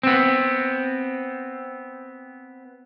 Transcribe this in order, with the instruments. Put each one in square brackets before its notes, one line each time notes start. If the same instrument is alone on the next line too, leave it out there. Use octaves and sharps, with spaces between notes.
[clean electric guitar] B3 C4